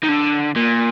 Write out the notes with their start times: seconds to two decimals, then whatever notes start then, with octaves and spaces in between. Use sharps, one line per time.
0.04 D#3
0.09 D3
0.56 A#2